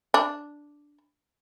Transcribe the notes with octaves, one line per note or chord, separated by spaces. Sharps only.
D4